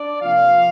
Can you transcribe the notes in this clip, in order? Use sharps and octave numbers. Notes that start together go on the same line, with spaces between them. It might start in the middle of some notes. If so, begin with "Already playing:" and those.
Already playing: D4 D5
C3 F3 A#3 F4 F5